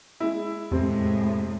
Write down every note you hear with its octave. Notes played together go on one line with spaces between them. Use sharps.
G#3 E4
F2 A2 C3 G#3 C4